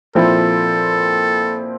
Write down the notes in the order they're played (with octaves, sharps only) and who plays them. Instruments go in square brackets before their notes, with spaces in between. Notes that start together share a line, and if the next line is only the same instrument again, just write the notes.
[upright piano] A#2 F3 C4 E4 [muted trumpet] A4